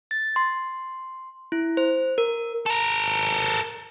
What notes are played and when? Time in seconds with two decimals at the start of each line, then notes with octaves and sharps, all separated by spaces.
0.11 A6
0.36 C6
1.52 E4
1.77 C5
2.18 A#4
2.66 A4 A#4